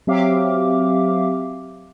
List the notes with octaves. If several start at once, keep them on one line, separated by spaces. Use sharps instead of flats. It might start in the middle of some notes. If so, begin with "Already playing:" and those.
F#3 C4 G4 E5 F5 D6